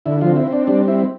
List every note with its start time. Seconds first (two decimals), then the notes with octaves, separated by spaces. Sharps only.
0.06 D3 E4
0.21 F3 F4
0.27 C4
0.36 E4
0.47 C4
0.53 D4
0.67 G3 D4
0.88 C4 E4